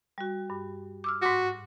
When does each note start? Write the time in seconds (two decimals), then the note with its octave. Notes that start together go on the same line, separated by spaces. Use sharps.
0.18 G3 F#4
0.50 G2
1.04 D6 E6 F6
1.22 G#2 F#4 D6